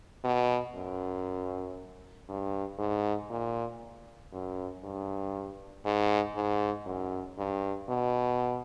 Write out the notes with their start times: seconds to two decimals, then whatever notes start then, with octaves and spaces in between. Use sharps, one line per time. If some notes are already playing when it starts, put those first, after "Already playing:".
0.24 B2
0.76 F#2
2.29 G2
2.79 G#2
3.30 A#2
4.33 F#2
4.84 G2
5.85 G#2
6.36 G#2
6.86 F#2
7.38 G2
7.89 B2